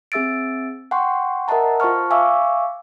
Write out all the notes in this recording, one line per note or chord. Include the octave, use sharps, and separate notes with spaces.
C4 G#4 E5 E6 A6 D7
F#5 G5 C6 C#6
A#4 D#5 E5 F#5 A5 A#5
F4 C5 A5 C#6 F6
E5 F5 G#5 C#6 D6 E6